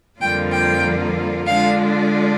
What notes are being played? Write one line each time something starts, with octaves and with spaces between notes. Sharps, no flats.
F2 D3 G3 A#3 F4 G5
G5
D3 G#3 D4 F4 F5